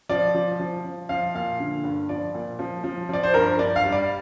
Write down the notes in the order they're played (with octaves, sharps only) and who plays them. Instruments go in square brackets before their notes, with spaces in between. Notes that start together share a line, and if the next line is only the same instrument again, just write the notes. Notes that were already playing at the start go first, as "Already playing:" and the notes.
[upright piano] F3 D5
F3
F3
F3
F3 F5
A#2 F5
D3
G2
F3 D5
A#2
F3
F3
F3 D5
C5
G2 A#4
G2 D5
F5
G3
D5